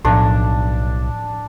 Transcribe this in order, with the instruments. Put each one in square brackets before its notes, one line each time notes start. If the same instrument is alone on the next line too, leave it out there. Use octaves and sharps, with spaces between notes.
[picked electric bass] B1 [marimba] A2 F3 [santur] D4